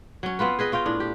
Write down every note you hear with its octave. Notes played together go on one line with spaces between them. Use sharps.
F#3 C#4
B3 C4 F4 B4
G#4 B4 D#5
C#4 F4 D#5 G5
A2 D4
G4